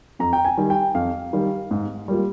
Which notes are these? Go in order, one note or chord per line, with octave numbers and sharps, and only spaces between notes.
F2 A#5
G5
G#5
D#3 G3
G5
F2 F5
D#3 G3
G#2
G3 A#3 F4